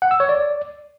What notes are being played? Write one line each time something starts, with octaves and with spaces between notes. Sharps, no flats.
F#5
E6
C#5
D5